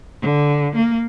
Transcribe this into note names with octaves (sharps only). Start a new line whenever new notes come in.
D3
A#3